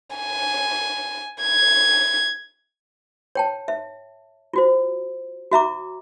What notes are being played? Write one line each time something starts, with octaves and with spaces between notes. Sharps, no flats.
G#5
G#6
C#5 G5 A5
E5
F4 F#4 C5
F#4 E5 A#5 D6